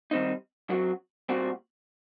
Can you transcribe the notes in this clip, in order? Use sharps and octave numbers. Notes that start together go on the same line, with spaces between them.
D#3 G3 C4 D#4
F#2 F#3 C4 F#4
A#2 G3 C4 F#4